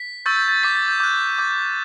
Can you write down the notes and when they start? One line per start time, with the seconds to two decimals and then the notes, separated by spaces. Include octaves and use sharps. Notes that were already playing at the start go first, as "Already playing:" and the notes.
Already playing: B6
0.26 C#6 E6 G6 A6
0.36 G6
0.48 A6
0.63 D6 G6 B6
0.76 A6
0.88 G6
1.00 D6 F#6 G6
1.39 D6 G6